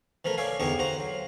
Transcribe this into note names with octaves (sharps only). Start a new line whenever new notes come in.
E3 F3 A3 A#4
C#5 D5 E5 F5 G#5
E2 D3 D#4 G4 D#5 C#6
F4 F#4 C5 A#5
F#3